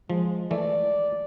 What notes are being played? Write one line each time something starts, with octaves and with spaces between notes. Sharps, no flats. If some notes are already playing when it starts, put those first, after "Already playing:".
F3 G#3
E3 A3 D5